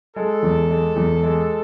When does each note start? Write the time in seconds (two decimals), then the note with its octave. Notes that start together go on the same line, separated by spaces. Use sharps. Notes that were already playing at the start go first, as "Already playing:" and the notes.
0.16 G#3 A4
0.43 E2
0.70 G#3
0.96 E2
1.23 G#3